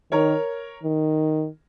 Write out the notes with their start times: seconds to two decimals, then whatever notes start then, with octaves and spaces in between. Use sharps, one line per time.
0.12 D#3 A#4 C#5
0.83 D#3